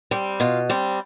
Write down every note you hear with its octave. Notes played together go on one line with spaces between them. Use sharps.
G3 C4
B2 F4
G3 C4